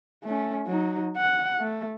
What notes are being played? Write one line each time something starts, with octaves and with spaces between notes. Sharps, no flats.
A3 C#4
F#3 D#4
F#5
A3